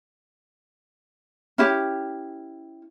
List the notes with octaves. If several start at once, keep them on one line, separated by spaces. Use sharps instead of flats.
C#4 E4 G4